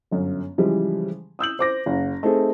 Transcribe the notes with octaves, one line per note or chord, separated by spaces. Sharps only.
G1 F#2
C#3 E3 F3 G3 G#3
D#6 E6 G6 F#7
C5 D6 A#6
F#1
A3 C4 D#4 G#4